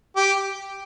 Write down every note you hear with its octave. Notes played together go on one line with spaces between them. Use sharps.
G4